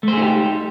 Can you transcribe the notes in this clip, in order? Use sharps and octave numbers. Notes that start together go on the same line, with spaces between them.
A3 D#4 G4 G#4 C5